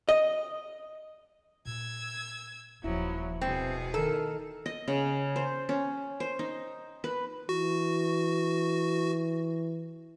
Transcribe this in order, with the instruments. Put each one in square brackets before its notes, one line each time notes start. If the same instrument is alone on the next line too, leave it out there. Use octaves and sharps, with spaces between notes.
[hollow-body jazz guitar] D#5
[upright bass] A#2 [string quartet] E6 G#6
[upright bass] D#1 C#4 [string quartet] F3 F#3 [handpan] E4
[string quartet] B2 G#4 [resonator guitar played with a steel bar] C4
[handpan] D#3 A#4 [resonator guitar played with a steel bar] A4
[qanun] D#5
C#3
C5
C#4
C5
D#4
B4
[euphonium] E3 [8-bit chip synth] F#4